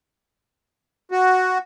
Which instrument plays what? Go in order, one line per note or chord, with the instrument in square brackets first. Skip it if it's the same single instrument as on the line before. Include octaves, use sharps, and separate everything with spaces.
[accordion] F#4